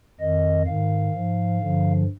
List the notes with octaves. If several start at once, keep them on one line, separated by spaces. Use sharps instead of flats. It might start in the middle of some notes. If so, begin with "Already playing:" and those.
F2 D#3 D#5
G#2 D#3 F5
G#2 F3
G2 D3 F3